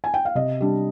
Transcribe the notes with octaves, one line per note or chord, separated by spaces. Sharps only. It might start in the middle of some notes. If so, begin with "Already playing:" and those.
G#5
G5
F5
C3 D#5
G3 D4